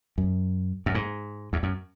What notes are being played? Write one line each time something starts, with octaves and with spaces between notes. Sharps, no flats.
F#2
F#2
G#2
E2
F#2